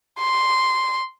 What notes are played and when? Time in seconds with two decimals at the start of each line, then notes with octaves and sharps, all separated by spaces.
0.19 C6